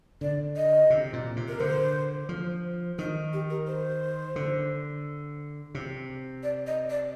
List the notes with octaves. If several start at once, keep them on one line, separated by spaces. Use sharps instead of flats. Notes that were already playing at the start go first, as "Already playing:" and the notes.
D3 D5
D#5
C3
A#2
C3
A#4
D3 C5
F3
D#3 D#4
G4
A#4
C5
D3
C3
D5
D#5
D5